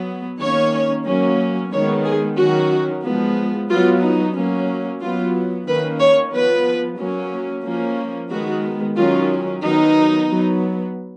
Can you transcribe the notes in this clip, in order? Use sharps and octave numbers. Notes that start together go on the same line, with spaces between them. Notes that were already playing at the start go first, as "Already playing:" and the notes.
Already playing: F#3 B3
D#3 A#3 C#4 C#5
F#3 A#3 C#4
D#3 G#3 B3 C#5
G#4
D#3 F#3 C#4 F#4
F3 G#3 B3
F#3 B3 F4
D#4
F#3 A#3 C#4
F#3 B3 F4
D#3 A#3 C#4 B4
C#5
F3 B3 B4
F#3 A#3 C#4
F3 A#3 C#4
D#3 G#3 B3 F#4
D#3 F#3 C#4 F4
D#3 F#3 B3 D#4
F#3 B3